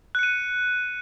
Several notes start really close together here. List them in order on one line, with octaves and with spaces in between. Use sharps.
F#6 C#7 D#7